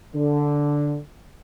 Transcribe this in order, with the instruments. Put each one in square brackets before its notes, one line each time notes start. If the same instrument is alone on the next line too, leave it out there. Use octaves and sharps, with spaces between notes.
[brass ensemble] D3